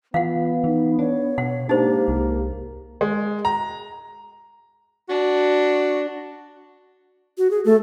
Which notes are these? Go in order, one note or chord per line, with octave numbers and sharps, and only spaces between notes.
E3 B3 F4 F5 F#5
E3 D#4
D4 C#5
B2 F#5
G#2 A#3 D4 D#4 G4 C5
C2
G#3
A#5
D4 F#4
F#4
G#4
A3 A4